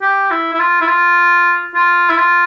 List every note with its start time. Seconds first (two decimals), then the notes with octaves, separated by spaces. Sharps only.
0.02 G4
0.31 E4
0.53 E4
0.59 F4
0.81 E4
0.87 F4
1.75 F4
2.09 E4
2.17 F4